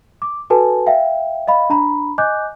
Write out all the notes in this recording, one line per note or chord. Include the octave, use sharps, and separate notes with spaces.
D6
F#4 A4 B4 G#5 A5
E5 F5 G5
D#5 F5 B5
D4 A#5 B5
D#5 G#5 D6 F#6 G6